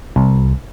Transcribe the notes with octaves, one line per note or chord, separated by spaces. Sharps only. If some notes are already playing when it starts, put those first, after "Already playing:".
C2